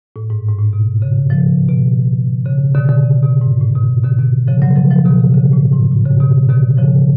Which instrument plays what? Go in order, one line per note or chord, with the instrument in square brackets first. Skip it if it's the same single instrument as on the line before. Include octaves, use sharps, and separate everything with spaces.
[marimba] A2
G#2
G#2
A2
B2
C#3
C#3 F3
B2
C#3
B2 D3
B2 D3
C#3
B2
G#2
A2
B2
B2 D3
B2 D3
C#3 F3
D3 F#3
C#3 F3
C#3 F3
B2 D3
C#3
C#3
A2
G#2
A2
C#3
B2
B2 D3
C#3 F3